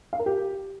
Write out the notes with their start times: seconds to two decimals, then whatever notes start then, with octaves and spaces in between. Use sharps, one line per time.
0.13 F5
0.19 A#4
0.26 G4